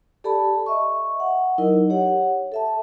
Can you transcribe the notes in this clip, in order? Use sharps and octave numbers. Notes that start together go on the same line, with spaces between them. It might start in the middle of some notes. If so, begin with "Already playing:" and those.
G4 A4 D5 A5 B5
D#5 E5 C#6
F#5
F#3 D#4 E4 A#4 D#5
G4 C#5 F#5
A4 E5 A5